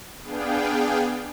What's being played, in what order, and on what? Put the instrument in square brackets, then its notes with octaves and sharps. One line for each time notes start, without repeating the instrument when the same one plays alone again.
[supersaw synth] B3 D4 G#4 F5 G5